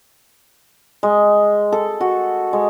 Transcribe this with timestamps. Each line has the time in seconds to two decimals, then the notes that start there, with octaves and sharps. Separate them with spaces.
1.03 G#3
1.72 A4
2.01 F#4
2.53 G#3